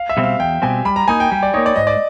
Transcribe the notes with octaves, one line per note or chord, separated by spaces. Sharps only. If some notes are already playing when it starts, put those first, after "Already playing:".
Already playing: F5
E5
B2 G3 C4
F5
E2 G5
B2 G3 C4 G#5
G3 B5
A#5
A#3 D#4 G#5
G5
G3 G5
D5
A#3 D#4 C#5
D5
G#2 D#5
D5